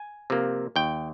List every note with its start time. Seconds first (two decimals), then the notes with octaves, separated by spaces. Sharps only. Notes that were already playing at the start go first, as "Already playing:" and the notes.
Already playing: G#5
0.30 C3 F3 A#3
0.76 D#2 G5